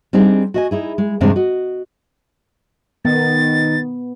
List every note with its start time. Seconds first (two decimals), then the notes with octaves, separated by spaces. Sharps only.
0.13 G3 C4 D4 D#4 G4 G#4
0.54 F#4 D#5 G#5
0.71 D#4 E4 G#4
0.98 G#3
1.21 E2 G2 C3 G#3 C4 D4
1.36 F#4 D#5
3.05 D#3 B3 A6